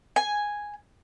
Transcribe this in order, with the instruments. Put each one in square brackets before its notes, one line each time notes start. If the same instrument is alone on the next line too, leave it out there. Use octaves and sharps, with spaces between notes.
[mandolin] G#5